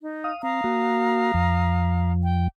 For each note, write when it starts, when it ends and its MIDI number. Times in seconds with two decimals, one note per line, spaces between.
0.01 0.30 63
0.24 0.42 77
0.24 0.42 87
0.43 0.61 60
0.43 2.11 77
0.43 2.11 82
0.43 2.11 87
0.64 1.32 58
0.64 1.32 66
1.34 2.48 41
1.34 2.48 53
2.24 2.46 79